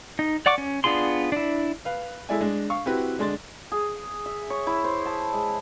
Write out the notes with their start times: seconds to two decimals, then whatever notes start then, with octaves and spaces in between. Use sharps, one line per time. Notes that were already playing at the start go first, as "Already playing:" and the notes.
0.19 D#4
0.46 D5 F#5 C#6 D6
0.58 C#4
0.84 B3 D4 F4 G#4 C6
1.32 D4 E4
1.85 B4 F5
2.29 G#3 E4 A4 D5 E5 G#5
2.41 G#3 D4
2.70 F5 C#6
2.86 C4 E4 F#4 G4 B4
3.18 D3 G#3 D4 C6 A6
3.72 G#4
4.26 E5
4.50 C#5
4.67 E4
4.84 C5
5.06 A5
5.33 G#3